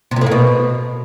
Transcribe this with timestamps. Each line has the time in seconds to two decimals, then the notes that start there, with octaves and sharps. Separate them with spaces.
0.11 C3
0.16 A#2
0.21 A2
0.26 A#3
0.31 B2